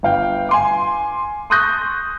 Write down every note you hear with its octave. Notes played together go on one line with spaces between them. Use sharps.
G1 F5 G5
G#5 C6 D6
C6 C#6 D#6 F#6 G6 A#6